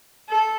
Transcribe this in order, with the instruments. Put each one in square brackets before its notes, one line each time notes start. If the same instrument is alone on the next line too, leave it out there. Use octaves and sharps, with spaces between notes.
[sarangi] A4